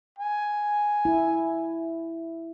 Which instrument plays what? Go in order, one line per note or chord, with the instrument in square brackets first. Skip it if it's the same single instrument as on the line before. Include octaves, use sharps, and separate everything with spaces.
[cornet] G#5
[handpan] E4